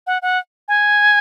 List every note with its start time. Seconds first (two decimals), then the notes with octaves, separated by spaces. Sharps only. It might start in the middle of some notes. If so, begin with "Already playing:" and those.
0.07 F#5
0.22 F#5
0.68 G#5